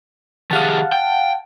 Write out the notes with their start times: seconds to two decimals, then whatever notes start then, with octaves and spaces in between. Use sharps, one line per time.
0.51 D#3 G4 G#4 F5 F#5 A5
0.92 G5